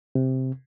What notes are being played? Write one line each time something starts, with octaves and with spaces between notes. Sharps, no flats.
C3